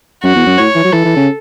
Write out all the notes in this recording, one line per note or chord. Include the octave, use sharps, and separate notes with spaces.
F#2 F#4
E2
F#2
A2 C#5
E3
F#3
E3 A4
E3
C#3